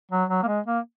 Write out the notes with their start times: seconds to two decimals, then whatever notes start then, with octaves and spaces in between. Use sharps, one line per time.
0.11 F#3
0.29 F#3
0.43 A#3
0.47 G#3
0.66 A#3